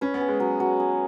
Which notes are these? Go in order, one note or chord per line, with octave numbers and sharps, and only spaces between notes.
C#4 B4
B3
G#4
G#3
F#3
F#3
G#4